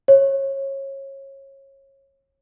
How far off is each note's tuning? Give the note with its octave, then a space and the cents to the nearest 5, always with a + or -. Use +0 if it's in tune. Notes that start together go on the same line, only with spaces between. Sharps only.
C#5 -25